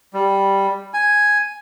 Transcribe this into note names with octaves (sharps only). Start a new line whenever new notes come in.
G3
G#5